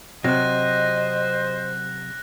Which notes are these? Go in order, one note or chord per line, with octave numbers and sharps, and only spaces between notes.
C3 F#3 C5 D#5 F#6 A#6